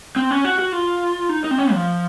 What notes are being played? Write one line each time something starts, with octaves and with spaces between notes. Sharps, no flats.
C4
C#4
F#4
F#4
F4
D#4
D#4
C4
C#4
F3